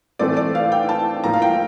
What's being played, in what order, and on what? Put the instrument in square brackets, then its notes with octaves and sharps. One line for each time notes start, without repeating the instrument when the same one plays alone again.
[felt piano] A2 E3 A3 C4 D5
D5
F5
G5
A5
A2 F3 A#3 A#5
F5
G5